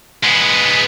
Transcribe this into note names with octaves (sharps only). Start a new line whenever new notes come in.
G#3 B3